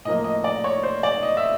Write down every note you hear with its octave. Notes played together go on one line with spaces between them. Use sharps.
A2 F3 A#3 D#5
D#5
D5
C#5
C5
D5
D#5
E5